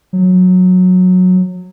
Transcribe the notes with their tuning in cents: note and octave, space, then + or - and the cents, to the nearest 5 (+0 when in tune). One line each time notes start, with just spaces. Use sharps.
F#3 -15